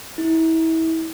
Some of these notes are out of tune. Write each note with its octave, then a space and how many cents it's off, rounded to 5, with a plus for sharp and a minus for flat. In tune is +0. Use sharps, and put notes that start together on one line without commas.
E4 -30